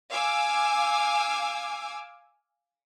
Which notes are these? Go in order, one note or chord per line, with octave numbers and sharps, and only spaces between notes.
F5 G#5 D6 E6